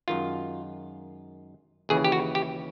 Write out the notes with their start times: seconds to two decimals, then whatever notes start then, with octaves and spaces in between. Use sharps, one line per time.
0.08 F#2 D#3 G#3 F4
1.89 D#2 C#3 E3 G#4
2.04 G4
2.12 F#4
2.35 G4